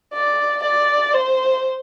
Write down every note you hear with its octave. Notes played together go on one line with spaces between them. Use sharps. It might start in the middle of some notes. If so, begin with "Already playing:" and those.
D5
D5
C5